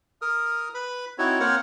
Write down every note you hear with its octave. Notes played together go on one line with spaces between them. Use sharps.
A#4 D#6 F6
B4 B5
C4 D#4 E4 F#4 C#5
A#3 C4 A#4 C5 C#5 F#5